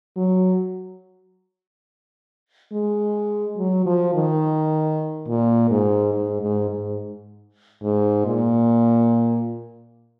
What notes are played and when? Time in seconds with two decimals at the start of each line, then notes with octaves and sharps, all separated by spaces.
0.16 F#3
2.72 G#3
3.58 F#3
3.86 F3
4.15 D#3
5.28 A#2
5.71 G#2
6.13 G#2
6.42 G#2
6.70 G#2
7.83 G#2
8.26 A#2